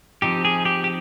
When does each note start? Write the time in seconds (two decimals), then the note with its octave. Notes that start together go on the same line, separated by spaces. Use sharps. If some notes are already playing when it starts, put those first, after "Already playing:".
0.22 F3 C4 D#4 G4
0.45 G#4
0.65 G4
0.84 G4